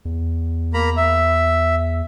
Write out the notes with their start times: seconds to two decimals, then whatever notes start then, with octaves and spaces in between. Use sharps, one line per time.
0.05 E2
0.74 A#3 A#5 B5
0.97 E5